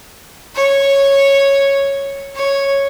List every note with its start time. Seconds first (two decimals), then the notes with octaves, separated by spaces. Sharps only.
0.55 C#5
2.36 C#5